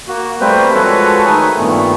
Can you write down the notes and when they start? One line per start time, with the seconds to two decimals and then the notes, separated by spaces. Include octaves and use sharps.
0.08 A#3 F#4
0.40 G3 A3 A#3 C4 B4 C5
0.73 F3 G#3 F#4 A4 B4 C#5
1.26 D#3 A3 D#4 B4 G#5 D#6
1.57 G2 A#2 D#3 A3 B3